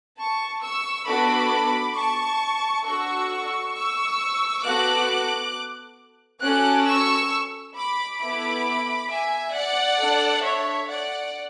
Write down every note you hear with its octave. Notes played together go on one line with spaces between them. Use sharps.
A5 C#6
C#6 E6
B3 D4 F#4 A4 B5 D6
A5 C#6
D4 F#4 A4 C#6 E6
C#6 E6
B3 F#4 A4 D6 F#6
C#4 F#4 A4 D6 F#6
C#6 E6
B5 D6
B3 E4 A4 B5 D6
E5 G#5
D5 F#5
D4 A4
C#5 E5
D5 F#5